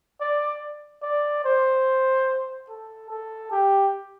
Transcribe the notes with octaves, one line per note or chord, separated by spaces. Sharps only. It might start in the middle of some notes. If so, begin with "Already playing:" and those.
D5
D5
C5
A4
A4
G4